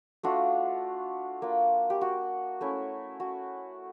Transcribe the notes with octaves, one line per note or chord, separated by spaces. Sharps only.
A3 D4 F4 F#4
A#3 D4 F4
G4
F#4
A3 C#4 E4
F#4